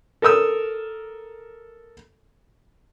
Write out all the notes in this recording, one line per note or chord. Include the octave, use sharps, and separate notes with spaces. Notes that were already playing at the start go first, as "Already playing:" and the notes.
A4 A#4 D#6 E6